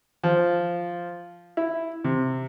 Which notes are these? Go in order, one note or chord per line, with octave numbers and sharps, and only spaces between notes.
F3
E4
C3